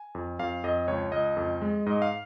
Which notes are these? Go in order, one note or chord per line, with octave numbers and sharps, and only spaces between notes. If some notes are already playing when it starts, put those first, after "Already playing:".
Already playing: G#5
F2
F2 F5
F2 D#5
C#2 C#5
C#2 D#5
F2
G#3
G#2 D#5
F5